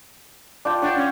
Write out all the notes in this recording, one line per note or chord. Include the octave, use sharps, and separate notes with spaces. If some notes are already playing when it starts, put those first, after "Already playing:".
D4 F4 G5
D4 C#5 F#5 G5
C#4